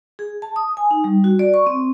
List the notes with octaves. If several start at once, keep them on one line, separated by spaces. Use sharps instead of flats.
G#4
A5
D#6
G#5
D#4
G3
F#4
D5
C#6
C4